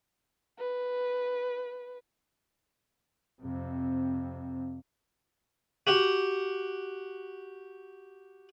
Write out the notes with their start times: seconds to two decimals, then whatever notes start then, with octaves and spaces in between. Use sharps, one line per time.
0.58 B4
3.41 F2 C3
5.87 F#4 G4 F#5